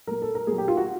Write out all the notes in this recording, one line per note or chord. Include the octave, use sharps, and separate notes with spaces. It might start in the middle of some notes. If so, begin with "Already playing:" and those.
A#2 F#3 A#4
A4
A#4
A#2 F#3 G#4
G4
F4
F#4